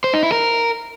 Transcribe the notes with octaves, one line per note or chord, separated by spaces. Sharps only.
C5
D#4
E4
A#4